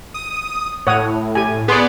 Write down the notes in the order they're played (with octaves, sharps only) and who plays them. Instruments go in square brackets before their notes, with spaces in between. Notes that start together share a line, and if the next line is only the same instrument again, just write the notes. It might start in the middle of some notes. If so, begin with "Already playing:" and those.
[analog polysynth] D#6
[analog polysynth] A2 [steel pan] C#5 F#5 D#6
[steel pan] G4 G#5
[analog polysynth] B3 D5 [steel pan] G#4 C6